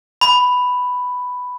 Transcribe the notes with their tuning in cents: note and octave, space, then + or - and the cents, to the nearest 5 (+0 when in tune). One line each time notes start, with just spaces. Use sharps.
B5 +5